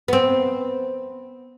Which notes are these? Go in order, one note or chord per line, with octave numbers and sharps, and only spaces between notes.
B3 C4